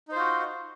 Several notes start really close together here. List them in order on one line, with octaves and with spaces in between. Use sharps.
D#4 C5 F4 F#4